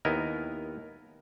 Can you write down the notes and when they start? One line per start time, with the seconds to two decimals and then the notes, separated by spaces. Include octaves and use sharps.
0.05 D#2 B3 E4 A#4 D#5